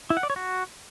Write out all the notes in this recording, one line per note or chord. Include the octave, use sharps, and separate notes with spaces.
E4
F#5
D5
C#5
F#4